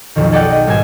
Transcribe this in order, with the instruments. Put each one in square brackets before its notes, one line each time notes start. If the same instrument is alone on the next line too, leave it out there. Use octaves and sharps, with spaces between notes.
[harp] B1 F2 D#3
G#4 A4 D5 D#5 F#5 G5
D#5
G#1 G3 G#3 B3 G#5 E7